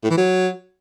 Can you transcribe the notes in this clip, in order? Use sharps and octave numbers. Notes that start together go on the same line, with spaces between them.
A2
E3
F#3